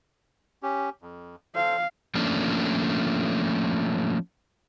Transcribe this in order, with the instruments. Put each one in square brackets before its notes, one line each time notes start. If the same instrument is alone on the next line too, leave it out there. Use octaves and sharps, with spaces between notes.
[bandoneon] C#4 G4
F2
[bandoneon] A4 C5 [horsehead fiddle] F5
[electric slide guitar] F3 A3 A#3 C#4 D4